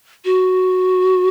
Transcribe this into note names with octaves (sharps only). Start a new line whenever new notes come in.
F#4